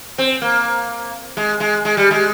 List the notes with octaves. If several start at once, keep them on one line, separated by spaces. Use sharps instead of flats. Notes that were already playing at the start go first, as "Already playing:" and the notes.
C4
A#3
G#3
G#3
G#3
G3
G#3